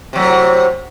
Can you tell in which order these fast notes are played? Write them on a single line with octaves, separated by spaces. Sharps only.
C3 F#3 A2